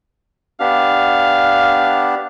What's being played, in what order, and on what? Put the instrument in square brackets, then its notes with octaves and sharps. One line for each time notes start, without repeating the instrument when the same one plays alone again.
[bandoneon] B3 D4 G4 [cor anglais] F5